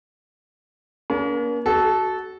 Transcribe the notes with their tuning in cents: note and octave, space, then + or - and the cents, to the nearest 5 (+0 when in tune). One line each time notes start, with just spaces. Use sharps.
A#3 +35 C#4 +45
F#4 +15 A4 -15